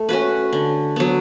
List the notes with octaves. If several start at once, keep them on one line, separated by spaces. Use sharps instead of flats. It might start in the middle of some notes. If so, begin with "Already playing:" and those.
Already playing: A3
C#4 F#4 B4
D3
F#3 B3